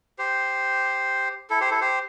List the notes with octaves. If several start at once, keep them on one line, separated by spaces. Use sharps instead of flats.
G4 C5
E4 A4
G4 C5
E4 A4
G4 C5